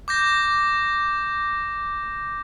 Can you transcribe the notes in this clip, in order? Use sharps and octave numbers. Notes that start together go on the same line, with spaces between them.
D6 G6 A#6